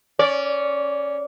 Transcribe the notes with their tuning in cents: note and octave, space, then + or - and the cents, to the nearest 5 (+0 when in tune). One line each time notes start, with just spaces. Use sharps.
C#4 +0 D5 -20